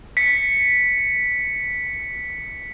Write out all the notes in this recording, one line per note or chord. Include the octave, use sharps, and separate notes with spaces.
B6 C#7